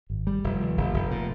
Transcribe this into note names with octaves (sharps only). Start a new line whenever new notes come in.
G#1
G3
F1
D#2
F1
F1
A#2